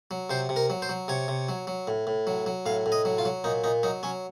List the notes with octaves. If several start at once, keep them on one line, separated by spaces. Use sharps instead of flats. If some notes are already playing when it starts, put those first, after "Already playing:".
F#3
C3 C5
C3
A#4
F#3
C5
F#3
C3 C#5
C3
F#3
F#3
A2
A2
F#3
F#3
A2 F5
A2
D#5
F#3
F4
F#3
A#2 D#4
A#2 D#4
F#3 D#4
F#3 C#4